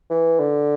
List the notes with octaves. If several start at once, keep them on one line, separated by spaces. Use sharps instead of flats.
E3
D3